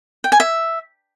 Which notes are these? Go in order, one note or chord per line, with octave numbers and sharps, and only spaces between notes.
G5
G#5
E5